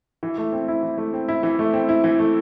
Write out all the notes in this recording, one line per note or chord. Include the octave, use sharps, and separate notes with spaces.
E3
A3
C4
E4
E3
A3
C4
E4
E3
A3
C4
E4
E3
A3